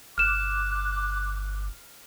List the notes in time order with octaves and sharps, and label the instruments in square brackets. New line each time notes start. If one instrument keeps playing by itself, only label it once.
[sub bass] G1 [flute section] D6 F#6 [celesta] F6 E7